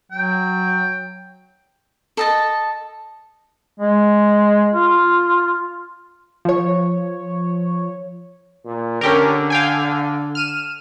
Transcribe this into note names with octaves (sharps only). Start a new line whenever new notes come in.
F#3 G5
A4 D#5 A5
G#3
F4
F3 C#5
A#2
D3 C#4 G4 A#4
F5 G5 G#5
F6 D#7 E7